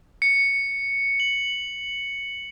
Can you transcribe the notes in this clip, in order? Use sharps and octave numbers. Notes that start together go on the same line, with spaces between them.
C#7
F#7